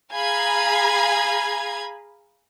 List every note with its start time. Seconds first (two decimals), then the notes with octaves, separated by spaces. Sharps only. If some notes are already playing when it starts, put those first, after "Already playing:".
0.14 G#4 F5 G#5 A#5 B5 G#6